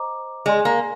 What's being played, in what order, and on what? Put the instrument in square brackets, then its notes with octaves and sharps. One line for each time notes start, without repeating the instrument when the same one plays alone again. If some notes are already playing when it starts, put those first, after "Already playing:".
Already playing: [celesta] C5 D#5 A#5 D6
[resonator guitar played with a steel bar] G#3 [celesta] G#4 D5 G#5 C6
[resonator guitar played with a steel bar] A#3